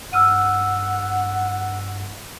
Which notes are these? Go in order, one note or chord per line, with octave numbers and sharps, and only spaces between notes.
G2 F#5 E6 F6 D#7